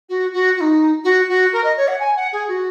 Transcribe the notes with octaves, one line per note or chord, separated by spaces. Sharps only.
F#4
F#4
F#4
D#4
F#4
F#4
A#4
D#5
C#5
F#5
G#5
F#5
G#4
F#4